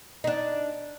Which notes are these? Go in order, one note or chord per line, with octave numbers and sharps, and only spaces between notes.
D4 D#4